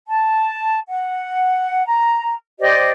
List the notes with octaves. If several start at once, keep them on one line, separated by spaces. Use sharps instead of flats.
A5
F#5
A#5
G4 C5 D5 D#5